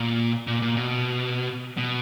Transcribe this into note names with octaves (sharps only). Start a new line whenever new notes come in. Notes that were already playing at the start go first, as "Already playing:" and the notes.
Already playing: A#2
A#2
A#2
B2
B2